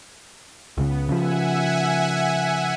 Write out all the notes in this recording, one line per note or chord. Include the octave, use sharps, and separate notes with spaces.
C#2 C#3 B3
C#3 F3 E5 F#5 G#5